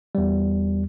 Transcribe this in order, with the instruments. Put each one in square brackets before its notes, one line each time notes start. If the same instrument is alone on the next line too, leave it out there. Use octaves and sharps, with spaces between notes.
[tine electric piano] E2 G3